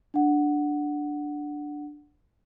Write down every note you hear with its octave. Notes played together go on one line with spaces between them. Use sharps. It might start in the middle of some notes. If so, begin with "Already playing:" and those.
D4 F#5